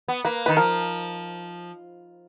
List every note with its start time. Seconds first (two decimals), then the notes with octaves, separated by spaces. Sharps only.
0.08 B3
0.25 A#3 B4
0.46 D#3 B4
0.57 F3 A#4